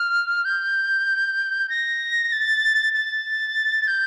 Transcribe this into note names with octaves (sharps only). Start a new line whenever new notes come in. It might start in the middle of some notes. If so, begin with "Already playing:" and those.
Already playing: F6
G6
A#6
A6
A6
G6